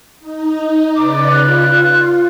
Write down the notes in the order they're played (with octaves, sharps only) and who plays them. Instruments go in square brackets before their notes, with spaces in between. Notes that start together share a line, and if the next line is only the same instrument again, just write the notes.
[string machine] D#4
[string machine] C#3 B4 D5 [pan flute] D6
[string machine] F4 [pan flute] F#6